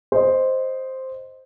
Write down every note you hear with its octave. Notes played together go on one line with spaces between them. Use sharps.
C5 D#5